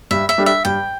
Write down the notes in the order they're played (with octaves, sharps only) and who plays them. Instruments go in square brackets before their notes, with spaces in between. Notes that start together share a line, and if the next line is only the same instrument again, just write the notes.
[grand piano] G2 [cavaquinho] E5
[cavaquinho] E5
[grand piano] G3 D4 A4
[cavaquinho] E5
[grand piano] G2 [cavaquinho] G5